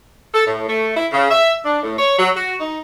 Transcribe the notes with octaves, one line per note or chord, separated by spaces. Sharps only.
A4
A2
A3
E4
C#3
E5
D4
A2
C#5
F#3
F#4
D#4